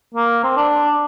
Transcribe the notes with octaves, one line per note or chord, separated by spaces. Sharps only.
A#3
C4
D4